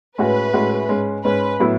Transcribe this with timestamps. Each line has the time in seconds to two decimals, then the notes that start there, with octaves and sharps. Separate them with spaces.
0.18 A2 G#3 C#4 F#4 B4
0.53 A2 G#3 C#4 F#4
0.89 G#2 G#3 C#4
1.24 G#2 G#3 C#4 B4
1.60 A2 F#3 B3 E4